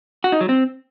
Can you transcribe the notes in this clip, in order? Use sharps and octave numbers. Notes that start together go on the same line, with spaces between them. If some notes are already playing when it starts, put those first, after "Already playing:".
F#4
D#4
F#3
C4